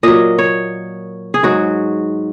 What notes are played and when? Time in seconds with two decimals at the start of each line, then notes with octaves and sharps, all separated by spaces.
0.03 A#2 F#3 D#5
0.38 C#5
1.34 G#4
1.43 G#2 F#3 F#4